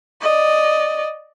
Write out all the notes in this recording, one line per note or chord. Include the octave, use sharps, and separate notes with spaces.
D5 D#5